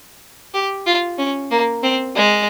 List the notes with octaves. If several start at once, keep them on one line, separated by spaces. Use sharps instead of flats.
G4
F4
C#4
A#3
C4
G#3